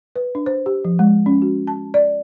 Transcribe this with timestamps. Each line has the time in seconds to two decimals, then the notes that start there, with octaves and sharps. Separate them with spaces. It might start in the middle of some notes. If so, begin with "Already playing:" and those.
0.16 B4
0.35 D4
0.46 C5
0.66 G4
0.85 F3
0.99 G#3
1.26 C#4
1.42 F#4
1.67 A5
1.94 D5